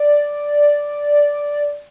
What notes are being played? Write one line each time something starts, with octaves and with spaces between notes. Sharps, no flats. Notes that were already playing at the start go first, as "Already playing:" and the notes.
Already playing: D5